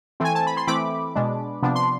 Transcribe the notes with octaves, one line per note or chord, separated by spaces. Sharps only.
E3 A3 C4 G#5
A5
B5
C6
E3 A3 C4 B5 D6
B2 G#3 D4
C3 F3 B3 D4
C6